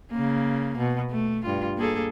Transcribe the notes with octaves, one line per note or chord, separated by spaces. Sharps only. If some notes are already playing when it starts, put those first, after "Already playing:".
C#3 A#3
B2
A3
G2 F4
A#3 G#4 A4